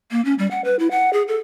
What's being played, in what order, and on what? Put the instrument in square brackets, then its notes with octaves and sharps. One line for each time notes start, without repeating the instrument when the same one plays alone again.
[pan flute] A#3
C#4
G3
F#5
B4
E4
F#5
G#4
A4